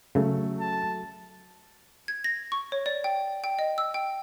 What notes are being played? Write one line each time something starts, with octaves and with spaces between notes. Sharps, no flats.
C#3 F#3 A3 A4
A5
G#6
A#6
C#6
C#5
D5
G5
G5
D#5
E6
G5